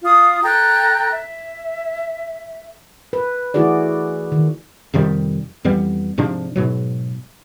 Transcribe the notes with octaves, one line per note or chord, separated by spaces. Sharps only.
F4 D#6
A4 G5 A#5 F#6
E5
B4
E3 A3 E4 F#4 G#4 D5
D#3
F2 C3 D#3 G3
F2 E3 G3 B3
G#2 C3 F3 D4
G#2 B2 F#3